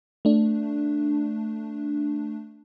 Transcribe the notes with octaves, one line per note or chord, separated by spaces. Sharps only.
A3 D4